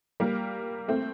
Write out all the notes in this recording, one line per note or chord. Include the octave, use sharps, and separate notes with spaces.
G3 A#3
A3 C4